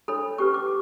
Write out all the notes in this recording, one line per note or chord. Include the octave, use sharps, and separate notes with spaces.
D4 A4 C#5 B5
C#4 G4 B4 C#6
D6